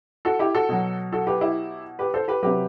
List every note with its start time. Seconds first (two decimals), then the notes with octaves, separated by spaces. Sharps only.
0.25 F#4 A4
0.39 E4 G4
0.55 F#4 A4
0.69 B2 F#3
1.12 F#4 A4
1.27 G4 B4
1.41 E4 G4
1.99 G4 B4
2.14 A4 C5
2.28 G4 B4
2.43 C3 F#3 G4 B4